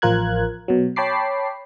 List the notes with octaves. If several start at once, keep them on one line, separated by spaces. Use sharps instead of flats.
A1 F3 F4 A#4 F#6 G#6
B2 F#3
C#5 G5 A5 B5 D6 C7